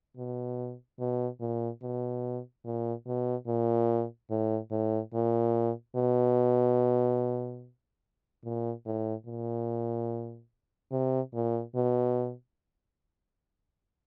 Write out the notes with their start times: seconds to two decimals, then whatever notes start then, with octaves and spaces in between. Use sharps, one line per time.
0.17 B2
0.99 B2
1.40 A#2
1.82 B2
2.64 A#2
3.06 B2
3.47 A#2
4.30 A2
4.71 A2
5.13 A#2
5.96 B2
8.44 A#2
8.86 A2
9.26 A#2
10.91 C3
11.33 A#2
11.75 B2